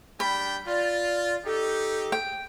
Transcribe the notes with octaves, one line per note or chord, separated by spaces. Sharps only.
G3 D4 G5 B5
F4 D5
D#4 G4 A4
G5